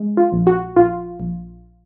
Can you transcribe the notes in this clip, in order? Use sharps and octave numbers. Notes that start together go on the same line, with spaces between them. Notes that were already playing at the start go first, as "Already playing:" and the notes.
Already playing: G#3
F4
A#1
F#4
A#1 F4
A#1